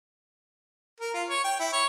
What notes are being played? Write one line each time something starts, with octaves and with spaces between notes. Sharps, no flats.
A#4
F4
C#5
G5
E4
C#5